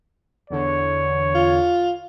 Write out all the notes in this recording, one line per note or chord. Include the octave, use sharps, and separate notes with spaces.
E2 D3 C#5
F4